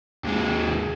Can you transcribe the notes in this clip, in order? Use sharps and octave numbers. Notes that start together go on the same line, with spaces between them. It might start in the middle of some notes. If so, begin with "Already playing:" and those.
D#2 G#3